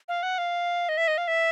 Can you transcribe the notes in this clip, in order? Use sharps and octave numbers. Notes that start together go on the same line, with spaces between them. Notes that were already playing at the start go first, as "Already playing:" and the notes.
F5
F#5
F5
D#5
E5
D#5
F5
E5